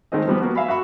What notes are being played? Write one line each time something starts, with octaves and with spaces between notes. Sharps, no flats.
D#3 G#3 A3 C4 D#5
F3 G3 B3
A#3 B3 F#4
E5 F5 G#5 B5
F#4 E5 B5 C#6